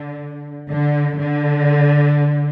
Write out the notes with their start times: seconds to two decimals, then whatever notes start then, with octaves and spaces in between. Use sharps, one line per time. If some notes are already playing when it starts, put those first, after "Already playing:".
Already playing: D3
0.71 D3
1.20 D3